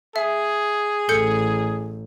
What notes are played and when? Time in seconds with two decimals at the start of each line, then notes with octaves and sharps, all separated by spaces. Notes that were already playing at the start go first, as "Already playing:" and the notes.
0.16 G#4 E5
1.09 A1 A4 G6 C#7